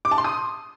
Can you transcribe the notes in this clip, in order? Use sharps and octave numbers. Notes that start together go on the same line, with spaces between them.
D6
A5
C6
D#6